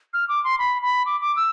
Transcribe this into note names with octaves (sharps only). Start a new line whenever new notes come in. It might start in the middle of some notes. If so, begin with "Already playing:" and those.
F6
D6
C6
B5
B5
D6
D6
E6